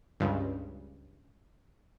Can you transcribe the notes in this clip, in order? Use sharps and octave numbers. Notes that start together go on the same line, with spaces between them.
C#2 G2